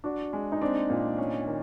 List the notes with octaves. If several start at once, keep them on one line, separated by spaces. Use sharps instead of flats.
D4 F#4
G#3
D#4
C4 D4
A#2
C#4
D#3